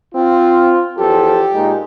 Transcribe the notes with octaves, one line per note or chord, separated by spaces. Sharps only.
C4 F4
E2 F3 G4 A4
A#2 G#3 D#4